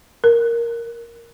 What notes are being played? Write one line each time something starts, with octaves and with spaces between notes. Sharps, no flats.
A#4